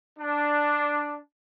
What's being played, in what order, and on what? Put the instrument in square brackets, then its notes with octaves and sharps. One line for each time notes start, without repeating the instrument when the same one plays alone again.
[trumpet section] D4